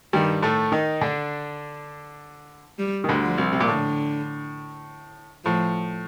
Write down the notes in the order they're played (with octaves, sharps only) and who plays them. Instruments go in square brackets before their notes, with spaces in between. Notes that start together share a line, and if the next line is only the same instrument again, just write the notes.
[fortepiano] G2 G3 [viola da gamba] D#3
[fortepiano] A2 A3
D#3 D#4
D3 D4
[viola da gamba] G3
[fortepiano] D#3
D2 D3
[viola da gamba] F3
[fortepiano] C2 C3
C3
A#2
[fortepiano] A2 [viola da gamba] D3
[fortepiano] A2 [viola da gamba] F3